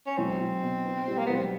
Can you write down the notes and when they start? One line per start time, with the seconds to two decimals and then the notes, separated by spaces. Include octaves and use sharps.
0.07 C#4
0.18 B1 C4
0.40 B1
0.63 B2
0.85 B3
1.08 G3
1.18 A#3
1.26 B1 B3
1.35 C4